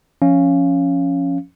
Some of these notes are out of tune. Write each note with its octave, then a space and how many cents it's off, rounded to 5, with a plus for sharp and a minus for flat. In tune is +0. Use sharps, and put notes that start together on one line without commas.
F3 +0 C#4 +0 F5 -10